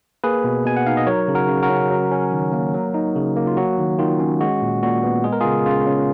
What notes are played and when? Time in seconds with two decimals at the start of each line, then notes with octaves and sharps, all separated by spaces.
0.24 A#3 G#4 B4
0.44 B2
0.66 B2 G#5
0.77 F#5
0.87 D#4 F5
0.97 D#5
1.07 F#3 A#4 C#5
1.28 C#3
1.35 F#4 A#4
1.49 C#3
1.63 F#4 A#4
1.70 C#4
1.90 F#3
2.11 C#4
2.32 D#3
2.52 A#3
2.74 F#3
2.94 D#4
3.15 C#3
3.36 A#3
3.47 F4
3.57 F#3 F#4
3.79 D#3
3.99 D#3 F4
4.20 C#4
4.41 G#3 F#4
4.62 A#2
4.82 A#2 F#4
5.04 B3
5.24 G#3 G#4
5.33 A#4
5.41 C#3 F4 G#4
5.66 C#3 F4
5.87 C#4